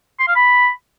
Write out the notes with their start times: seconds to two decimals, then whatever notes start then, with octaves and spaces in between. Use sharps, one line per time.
0.19 C6
0.27 F5
0.36 B5